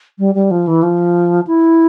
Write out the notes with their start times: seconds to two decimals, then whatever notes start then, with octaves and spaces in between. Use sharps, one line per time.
0.19 G3
0.35 G3
0.51 F3
0.67 E3
0.83 F3
1.47 E4